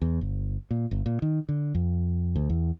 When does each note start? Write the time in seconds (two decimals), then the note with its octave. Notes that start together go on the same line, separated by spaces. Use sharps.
0.02 E2
0.21 G1
0.71 A#2
0.91 G1
1.06 A#2
1.22 D#3
1.49 D3
1.75 F2
2.36 D2
2.50 E2